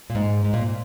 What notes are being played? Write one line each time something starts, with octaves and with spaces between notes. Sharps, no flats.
A#2
G#2
G#2
A#2